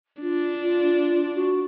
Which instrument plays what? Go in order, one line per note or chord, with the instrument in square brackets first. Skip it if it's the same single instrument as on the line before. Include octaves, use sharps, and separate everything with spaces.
[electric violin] D4 [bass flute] F4
[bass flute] F4
F#4